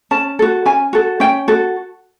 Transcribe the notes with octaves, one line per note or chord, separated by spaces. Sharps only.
C#4 A5
F#4 A4
C#4 G#5
F#4 A4
C#4 G5
F#4 A4